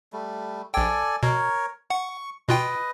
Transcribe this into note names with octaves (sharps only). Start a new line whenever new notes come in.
G3 A3
A#1 A4 D5 G5 G#5
B2 A#4 C#5
F#5 C#6
B2 F4 B4 D#5 G5